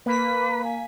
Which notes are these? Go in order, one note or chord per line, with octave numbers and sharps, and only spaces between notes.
A#3 B4 B6
G#5